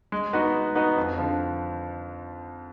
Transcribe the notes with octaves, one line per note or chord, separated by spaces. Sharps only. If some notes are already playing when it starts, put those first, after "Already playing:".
G#3
B3 D#4 F#4 B4
G#3
B3 D#4 F#4 B4
F2
D3 F3